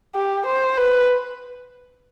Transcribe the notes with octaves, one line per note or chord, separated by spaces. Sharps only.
G4
C5
B4